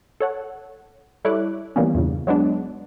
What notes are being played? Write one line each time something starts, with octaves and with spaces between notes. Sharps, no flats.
A4 C#5 F#5
G3 E4 A4 C#5 D6 F#6
D#3 E3 G3 A#3 B3 C#4
E2 G2 A#2 C#3
F#3 G#3 B3 D4